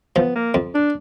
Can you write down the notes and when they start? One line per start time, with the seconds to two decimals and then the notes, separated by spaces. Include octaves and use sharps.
0.16 F3 B3
0.35 A#3
0.54 F2
0.74 D4